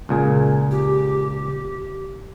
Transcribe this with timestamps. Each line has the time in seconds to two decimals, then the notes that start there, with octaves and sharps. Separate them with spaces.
0.09 C#2 A#2 G#4
0.71 G4